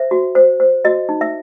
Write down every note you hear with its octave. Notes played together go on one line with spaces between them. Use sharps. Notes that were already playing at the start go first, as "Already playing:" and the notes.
Already playing: C5 E5
F#4
C5
C5
F#4 D#5
D#4
E5